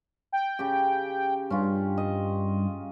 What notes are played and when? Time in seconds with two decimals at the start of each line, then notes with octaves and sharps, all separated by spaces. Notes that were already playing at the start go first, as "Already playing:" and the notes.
0.32 G5
0.59 C#3 G4
1.50 G2 C#4 F4
1.97 D#5